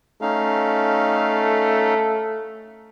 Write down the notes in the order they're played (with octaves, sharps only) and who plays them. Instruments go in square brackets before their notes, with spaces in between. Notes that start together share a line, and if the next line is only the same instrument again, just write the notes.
[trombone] A3 [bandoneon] C#4 D#4 F5